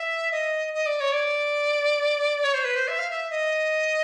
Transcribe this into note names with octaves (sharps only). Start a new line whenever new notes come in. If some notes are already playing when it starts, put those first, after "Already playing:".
Already playing: E5
D#5
D#5
D5
C#5
D5
C#5
C5
B4
C5
E5
F5
E5
D#5